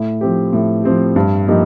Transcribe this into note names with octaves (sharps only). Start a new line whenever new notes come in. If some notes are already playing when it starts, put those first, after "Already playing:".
Already playing: A2
F3 C4 G4
A2
F3 C4 G4
G2
F3 A#3 D#4 G4